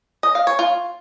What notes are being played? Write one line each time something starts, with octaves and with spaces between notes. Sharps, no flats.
D#5
F5
C#5
F4